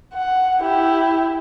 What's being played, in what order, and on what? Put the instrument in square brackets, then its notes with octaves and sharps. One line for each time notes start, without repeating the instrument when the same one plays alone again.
[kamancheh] F#5
E4 G4